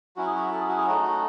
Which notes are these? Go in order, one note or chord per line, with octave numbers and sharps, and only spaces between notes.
F#3 C#4 E4 F#4
G#4
F#4
A4
G#4
F#4
G#4
A3 D#4 F#4
G#4
F#4